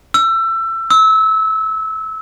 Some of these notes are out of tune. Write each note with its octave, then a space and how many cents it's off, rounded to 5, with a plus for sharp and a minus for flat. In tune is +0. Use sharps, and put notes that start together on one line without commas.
E6 +25
E6 -25